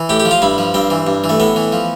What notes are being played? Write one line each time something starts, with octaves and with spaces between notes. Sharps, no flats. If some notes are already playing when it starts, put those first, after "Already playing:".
Already playing: E3
A2 G4
G4
F3
F4
G2 E4
F3
G2 C4
E3
G2
E3
A3
A2 B3
E3
F3